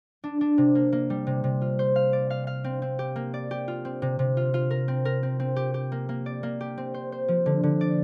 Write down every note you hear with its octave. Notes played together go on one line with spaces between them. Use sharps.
D4
D4
C3
A#3
A#3
G3
C3
C3
F4
C5
F5
D5
F5
F5
C4
C4
G4
A#3
D5
G4
F4
C4
C3
C3
F4
F4
A#4
C4
A#4
C4
C4
G4
G4
A#3
A#3
D5
A#3
G4
C4
C5
C5
F3
D3
D3
D5